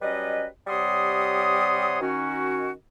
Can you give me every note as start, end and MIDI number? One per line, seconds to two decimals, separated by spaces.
0.02 0.46 54
0.02 0.46 55
0.02 0.46 61
0.02 0.46 71
0.02 0.46 75
0.67 1.99 48
0.67 1.99 55
0.67 1.99 73
0.67 1.99 78
0.67 1.99 84
0.67 1.99 87
2.01 2.71 51
2.01 2.71 61
2.01 2.71 66